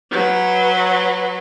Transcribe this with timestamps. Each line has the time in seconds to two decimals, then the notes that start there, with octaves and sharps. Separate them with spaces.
0.11 F#3 B4